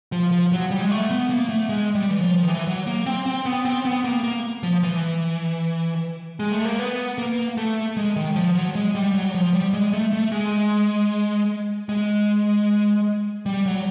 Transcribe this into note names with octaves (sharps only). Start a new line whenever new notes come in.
F3
F3
F#3
G3
G#3
A3
B3
A#3
A3
G#3
G3
E3
F3
D#3
E3
F#3
A#3
C4
C4
B3
C4
B3
A#3
A#3
F3
E3
G#3
A3
A#3
B3
A#3
A3
G#3
D#3
F3
F#3
G#3
G3
F#3
F3
G3
G#3
A3
A3
G#3
G#3
G3
F#3